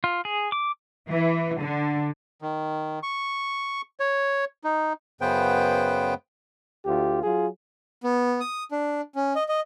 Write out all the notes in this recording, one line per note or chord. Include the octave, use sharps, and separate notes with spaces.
F4
G#4
D6
E3
D3
D#3
C#6
C#5
D#4
F#2 C#3 B3 B4 C5 G5
D2 F4 G4
F#3 F4 G#4
B3
D#6
D4
C#4
D#5
D#5